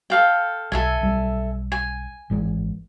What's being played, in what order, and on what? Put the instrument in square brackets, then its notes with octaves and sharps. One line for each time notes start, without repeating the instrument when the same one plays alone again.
[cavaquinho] A4 F5 G5
[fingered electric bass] B1 [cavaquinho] A4 E5 G#5
[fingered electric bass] B1 G3
[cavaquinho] G#5
[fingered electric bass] G#1 E3 G#3